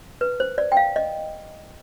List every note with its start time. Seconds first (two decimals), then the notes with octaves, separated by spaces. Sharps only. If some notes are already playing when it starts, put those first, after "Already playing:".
0.21 B4
0.40 C5
0.58 D5
0.72 G5
0.77 F5
0.96 D#5